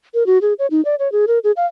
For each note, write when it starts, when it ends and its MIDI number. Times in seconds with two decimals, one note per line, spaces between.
0.14 0.26 70
0.26 0.38 66
0.42 0.53 68
0.59 0.67 73
0.71 0.83 63
0.85 0.95 74
0.99 1.11 73
1.12 1.25 68
1.27 1.39 70
1.44 1.52 68
1.57 1.66 77